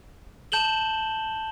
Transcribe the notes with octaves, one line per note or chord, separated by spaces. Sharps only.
A5 G6 E7 F#7 G7